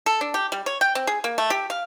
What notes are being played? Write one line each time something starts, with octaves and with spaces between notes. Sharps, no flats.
A4
D4
G4
G3
C#5
G5
C4
G#4
A#3
A3
G4
F5